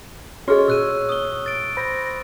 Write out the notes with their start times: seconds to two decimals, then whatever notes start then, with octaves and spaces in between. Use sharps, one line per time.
0.48 C#4 F#4 G#4 C#5 D#5 C#6 F6
0.68 A#2 E6 F#6 D#7
1.09 D#6 G7
1.46 A6 D7
1.77 C5 B5 A#6